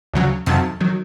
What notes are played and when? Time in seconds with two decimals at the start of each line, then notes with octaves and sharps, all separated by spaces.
0.14 D2 C#3 F#3
0.46 F2 C3 D#3 F#3 A5
0.81 D#3 F#3